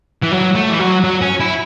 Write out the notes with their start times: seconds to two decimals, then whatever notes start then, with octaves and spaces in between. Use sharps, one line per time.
0.23 E3
0.32 F#3
0.56 A3
0.70 E3
0.80 F#3
1.04 F#3
1.22 C#4
1.40 E4